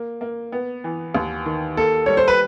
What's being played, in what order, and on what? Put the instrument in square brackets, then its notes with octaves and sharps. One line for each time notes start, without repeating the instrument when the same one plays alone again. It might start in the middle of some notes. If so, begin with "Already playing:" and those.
Already playing: [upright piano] A#3
A#3
B3
E3
D#2
D#3
[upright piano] A#3 [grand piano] A4
[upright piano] G3 [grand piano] C#5
[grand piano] C5
B4